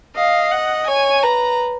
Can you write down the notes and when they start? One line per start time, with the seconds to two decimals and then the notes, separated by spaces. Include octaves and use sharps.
0.15 D#5 F5
0.51 F#5
0.87 C#5 G#5
1.22 B4 A#5